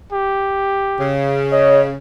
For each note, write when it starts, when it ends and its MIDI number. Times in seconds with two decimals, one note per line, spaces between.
0.12 1.14 67
1.00 1.96 49
1.51 1.81 73
1.51 1.83 75